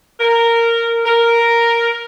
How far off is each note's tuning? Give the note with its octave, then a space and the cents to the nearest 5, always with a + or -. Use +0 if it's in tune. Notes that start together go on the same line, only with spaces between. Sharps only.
A#4 -10
A#4 +0